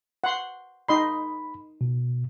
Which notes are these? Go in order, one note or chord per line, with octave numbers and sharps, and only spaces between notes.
F#5 C6
D#4 D#5 B5 C6
B2